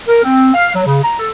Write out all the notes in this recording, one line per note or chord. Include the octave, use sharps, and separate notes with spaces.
A#4
C4
F5
F#3
C#3
A#5
A4